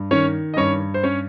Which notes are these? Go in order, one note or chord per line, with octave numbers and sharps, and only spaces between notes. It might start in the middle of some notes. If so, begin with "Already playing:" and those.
Already playing: G2
D#3 C#4 C#5
D#5
G2 C#4 C#5
C5
C#4 C#5